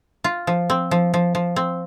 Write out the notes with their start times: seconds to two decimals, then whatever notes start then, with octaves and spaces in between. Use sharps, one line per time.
0.24 F4
0.47 F3
0.70 C4
0.91 F3
1.14 F3
1.35 F3
1.56 C4